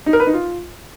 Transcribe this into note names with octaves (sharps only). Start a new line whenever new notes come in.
D#4
A#4
B4
D#4
F4